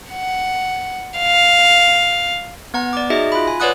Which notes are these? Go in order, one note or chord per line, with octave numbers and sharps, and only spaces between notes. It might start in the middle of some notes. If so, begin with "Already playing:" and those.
F#5
F5
B3 F#5 A#5
D5 D6
D#4 F#4 G#4 D#5 E5
F4 B5
G#5
B4 C#5 D5 F#5 D#6 F#6